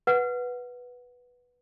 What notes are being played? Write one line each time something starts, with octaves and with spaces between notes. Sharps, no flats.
B4 F#5